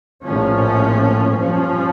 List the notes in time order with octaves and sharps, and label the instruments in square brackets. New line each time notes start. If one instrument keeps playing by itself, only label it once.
[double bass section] A#1 A2 F3 C#4
G2 F3 C#4